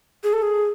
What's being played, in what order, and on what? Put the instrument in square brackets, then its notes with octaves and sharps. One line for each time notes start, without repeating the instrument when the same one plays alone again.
[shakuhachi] G#4
A4
G#4